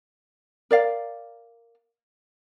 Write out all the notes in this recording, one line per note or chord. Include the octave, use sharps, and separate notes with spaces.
A#4 D5 F5